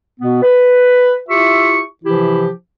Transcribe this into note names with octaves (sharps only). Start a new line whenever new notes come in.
B2 B3
B4
E4 F4 G4 E5 C#6
C3 E3 F3 E4 G4